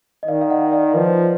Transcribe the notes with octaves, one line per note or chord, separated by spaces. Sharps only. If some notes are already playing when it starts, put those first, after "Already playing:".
D#5
D#3 D5 F5
F5
D#5 F#5
D5 F5
F3 B4 D#5